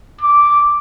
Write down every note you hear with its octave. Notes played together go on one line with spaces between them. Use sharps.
D6